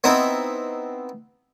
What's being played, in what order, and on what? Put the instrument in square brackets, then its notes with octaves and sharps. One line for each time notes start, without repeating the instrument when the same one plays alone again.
[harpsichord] B3 C4 D#4 E4